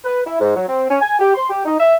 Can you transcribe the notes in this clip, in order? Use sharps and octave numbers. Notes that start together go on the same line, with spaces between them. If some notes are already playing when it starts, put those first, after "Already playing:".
B4
E4
G#2
F#3
C4
C#4
G#5
G4
C6
G4
D#4
E5